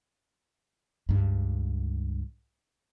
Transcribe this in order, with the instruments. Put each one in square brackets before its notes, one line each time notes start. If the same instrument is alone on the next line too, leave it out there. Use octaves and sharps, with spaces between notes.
[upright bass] C#2 G2